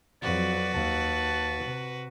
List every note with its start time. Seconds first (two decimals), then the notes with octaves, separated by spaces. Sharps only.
0.22 F2 F#3 F#4 B4 D5
0.74 D#2 A5
1.64 C3